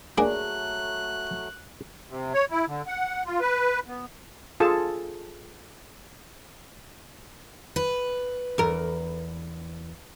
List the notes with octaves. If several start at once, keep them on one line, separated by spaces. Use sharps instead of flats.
F#3 A3 A#3 D4 G#4 D5 F#6
C3
C#5
E4
D3
F#5
F4
B4
B3
F4 G#4 A4 A5
B4
E2 A#4